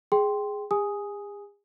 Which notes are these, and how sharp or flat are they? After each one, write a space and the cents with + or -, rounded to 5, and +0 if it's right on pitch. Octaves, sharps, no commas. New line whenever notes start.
G#4 +0 G5 +0 C6 +0
G#4 -40 G#5 +0 D#6 +5